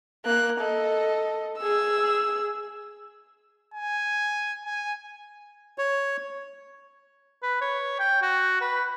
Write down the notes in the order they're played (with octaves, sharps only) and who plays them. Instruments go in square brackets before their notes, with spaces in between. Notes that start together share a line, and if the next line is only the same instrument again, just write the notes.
[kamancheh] A#3 F#6
A4 D#5
G#4 E6
[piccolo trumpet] G#5
G#5
[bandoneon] C#5
[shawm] B4
C#5
G5
F#4
B4